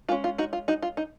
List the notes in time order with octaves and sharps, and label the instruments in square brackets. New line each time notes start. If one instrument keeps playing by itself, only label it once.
[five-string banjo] G#3 C#4 F4
F4
D#4 F#4
F4
D#4 F#4
F4
D#4